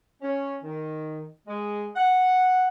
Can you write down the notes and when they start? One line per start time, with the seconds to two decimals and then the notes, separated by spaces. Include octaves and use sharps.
0.22 C#4
0.63 D#3
1.48 G#3
1.96 F#5